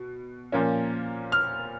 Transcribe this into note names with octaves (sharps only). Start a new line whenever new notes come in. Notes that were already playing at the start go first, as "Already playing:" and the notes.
Already playing: B2
A#2 F3 A#3 C#4
F6